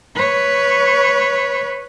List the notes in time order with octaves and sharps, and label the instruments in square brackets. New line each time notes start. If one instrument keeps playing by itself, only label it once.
[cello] B4 C#5